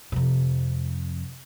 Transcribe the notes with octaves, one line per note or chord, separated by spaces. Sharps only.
F2 C3